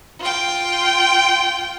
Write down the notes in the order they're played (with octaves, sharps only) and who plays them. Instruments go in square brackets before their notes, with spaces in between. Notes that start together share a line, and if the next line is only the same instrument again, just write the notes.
[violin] F4 G5